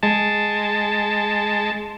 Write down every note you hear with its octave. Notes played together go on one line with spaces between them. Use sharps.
G#3 A5